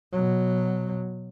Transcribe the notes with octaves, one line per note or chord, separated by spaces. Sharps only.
B2 F#3